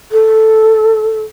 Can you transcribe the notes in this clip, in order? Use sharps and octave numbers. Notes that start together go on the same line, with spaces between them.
A4